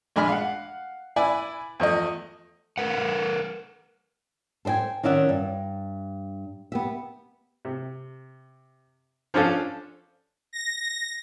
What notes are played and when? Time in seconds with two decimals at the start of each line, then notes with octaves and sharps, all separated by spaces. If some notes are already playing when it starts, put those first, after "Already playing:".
0.16 A#1 G#3 D4 G#5 B5 F6
0.29 F5 F#5
1.16 E4 B4 D5 G#5 E6
1.80 E2 F3 A3 D#5
2.78 A#4 B4 F#5
4.65 A4 C5 D#5 G5 G#5
5.03 D#3 C#4 D5 E5 F#5
5.29 G2
6.72 B3 G4 E5
7.65 C3
9.34 F3 C#4 D4 A4 F5
10.53 A#6